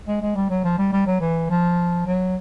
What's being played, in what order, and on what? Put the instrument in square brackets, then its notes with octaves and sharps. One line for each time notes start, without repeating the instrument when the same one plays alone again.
[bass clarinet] G#3
G#3
G3
F#3
F3
G3
G3
F#3
E3
F3
F#3